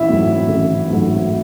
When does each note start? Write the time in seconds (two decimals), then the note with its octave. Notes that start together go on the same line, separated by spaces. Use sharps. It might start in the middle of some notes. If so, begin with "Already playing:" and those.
Already playing: A1 E4 E5
0.09 G#2 F#3 A3
0.49 A1
0.90 G#2 F#3 A3